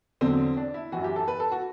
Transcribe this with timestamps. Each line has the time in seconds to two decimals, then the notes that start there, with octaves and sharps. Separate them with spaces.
0.21 E2 D3 F#3 C4
0.57 D4
0.74 E4
0.92 F#2 E3 F#4
1.04 G4
1.16 A4
1.28 B4
1.40 A4
1.52 F#4